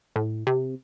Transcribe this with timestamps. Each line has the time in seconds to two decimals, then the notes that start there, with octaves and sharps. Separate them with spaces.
0.16 A2
0.47 C3